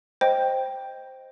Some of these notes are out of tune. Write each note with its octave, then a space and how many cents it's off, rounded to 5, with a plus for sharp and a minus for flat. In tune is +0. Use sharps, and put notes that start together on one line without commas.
C5 +0 D#5 +0 G5 +0